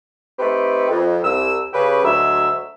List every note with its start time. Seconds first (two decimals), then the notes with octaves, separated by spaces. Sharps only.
0.39 A3 C4 D#4 G4 B4
0.90 F2
1.24 C2 E6
1.73 C#3 G4 B4
2.04 D2 F#3 G#3 E5 E6